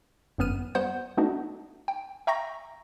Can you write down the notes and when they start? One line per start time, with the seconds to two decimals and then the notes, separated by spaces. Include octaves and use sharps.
0.38 G1 F#2 B3 F6 D#7
0.75 G3 B3 C5 F#5 G6
1.17 A3 B3 D4 D#4 F#4
1.88 G5
2.27 E5 G5 A#5 C#6 G6 A#6